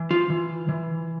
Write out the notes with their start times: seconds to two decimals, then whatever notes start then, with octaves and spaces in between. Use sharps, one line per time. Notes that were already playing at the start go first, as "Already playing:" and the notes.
Already playing: E3
0.11 F4
0.30 E3
0.69 E3